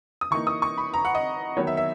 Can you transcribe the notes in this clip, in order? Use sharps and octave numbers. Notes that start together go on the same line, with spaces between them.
D#6
E3 A#3 D#4 C#6
D#6
C#6
B5
A#5
F#5
D#5
D#3 F#3 B3 D#4 C#5
E5
E5